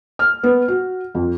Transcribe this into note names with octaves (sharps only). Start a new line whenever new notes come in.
F6
B3
F#4
F2